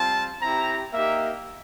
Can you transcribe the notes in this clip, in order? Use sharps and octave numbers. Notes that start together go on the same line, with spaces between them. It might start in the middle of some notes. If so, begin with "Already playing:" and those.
Already playing: G3 C4 F4 A5
C4 E4 G4 A#5
A#3 D#4 G4 E5